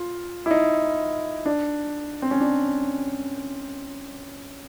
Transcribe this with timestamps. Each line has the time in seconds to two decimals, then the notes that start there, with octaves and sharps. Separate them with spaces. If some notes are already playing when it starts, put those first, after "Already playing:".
Already playing: F4
0.46 E4
0.51 D#4
1.46 D4
2.22 C4
2.31 C#4
2.40 D4